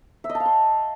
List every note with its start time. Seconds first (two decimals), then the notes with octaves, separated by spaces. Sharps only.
0.24 E5
0.29 D#5
0.35 A5
0.40 F5
0.45 C6